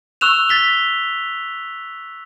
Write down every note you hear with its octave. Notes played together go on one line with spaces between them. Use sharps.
C#6 E6 F#6 E7 F7
A6 B6 G7